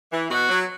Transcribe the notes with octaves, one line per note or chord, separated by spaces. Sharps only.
E3
B2 F#4
F#3